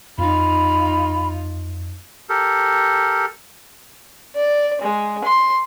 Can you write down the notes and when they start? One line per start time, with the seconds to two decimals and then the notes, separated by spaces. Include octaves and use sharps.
0.18 F2 D#4 F4 B5
2.29 G4 A4 A#4
4.36 D5
4.81 G#3
5.24 C6